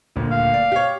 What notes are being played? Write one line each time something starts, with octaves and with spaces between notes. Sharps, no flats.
D#1 D2
F5
D5
G4 C#5